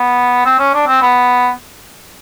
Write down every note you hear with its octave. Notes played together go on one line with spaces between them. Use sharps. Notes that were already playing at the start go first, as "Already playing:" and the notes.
Already playing: B3
C4
C#4
D4
C4
B3